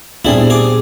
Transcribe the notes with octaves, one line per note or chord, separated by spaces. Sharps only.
A#2 G3 B3 C4 D4 E4 G#4
G#4 D6